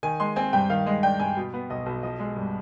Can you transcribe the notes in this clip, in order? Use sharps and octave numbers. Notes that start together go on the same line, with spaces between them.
D#3 G#5
G#3 C6
C4 G#5
G2 G5
D#3 F5
G#3 D#5
D4 G5
G2 G#5
B2
B3
B1 D#5
B1
F3 D#5
G#3
G2